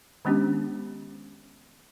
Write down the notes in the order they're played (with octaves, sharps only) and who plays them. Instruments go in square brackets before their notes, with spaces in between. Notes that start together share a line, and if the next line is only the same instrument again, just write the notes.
[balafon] D#3 G#3 B3 C#4 D4 G4